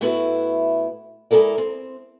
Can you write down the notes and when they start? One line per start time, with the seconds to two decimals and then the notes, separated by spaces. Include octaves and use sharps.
0.01 A2 A3 B3 E4 F#4 B4
1.31 G#3 E4 A4 A#4 D5
1.58 C4